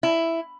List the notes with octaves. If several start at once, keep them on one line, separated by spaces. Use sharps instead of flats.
E4